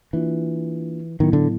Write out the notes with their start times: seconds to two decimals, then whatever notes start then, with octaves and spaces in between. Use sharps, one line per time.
0.13 E3 A#3 D4 F4
1.20 A2 D#3 F#3 B3 E4
1.33 D3